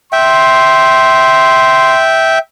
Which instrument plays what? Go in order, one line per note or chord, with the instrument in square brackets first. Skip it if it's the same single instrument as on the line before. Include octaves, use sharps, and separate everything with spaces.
[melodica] E5 G5 [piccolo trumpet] C6